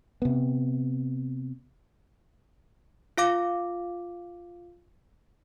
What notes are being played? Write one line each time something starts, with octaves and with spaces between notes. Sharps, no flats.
C3 B3
F4 F5 D6